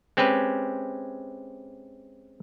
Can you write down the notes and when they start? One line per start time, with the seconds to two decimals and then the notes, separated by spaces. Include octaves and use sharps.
0.17 G#3 C4 C#4 G4 B4